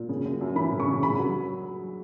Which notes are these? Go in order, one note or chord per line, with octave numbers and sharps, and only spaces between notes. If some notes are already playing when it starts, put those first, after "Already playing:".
Already playing: A#2
C#3
F#2
F#2
E3 B5
C#3
C#6
C#3
C#3 B5
F#3